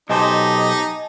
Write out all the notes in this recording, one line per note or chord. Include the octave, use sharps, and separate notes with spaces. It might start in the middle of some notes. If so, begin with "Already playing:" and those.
B1 D#4 G4 C5 D#5 G#5 A5